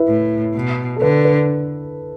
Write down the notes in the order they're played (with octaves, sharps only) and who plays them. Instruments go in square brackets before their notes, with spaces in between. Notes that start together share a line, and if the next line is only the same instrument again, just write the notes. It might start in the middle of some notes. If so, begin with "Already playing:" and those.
Already playing: [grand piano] E4 B4
[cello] A2
B2
[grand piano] A4
[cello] D3 [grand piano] B4
[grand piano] B4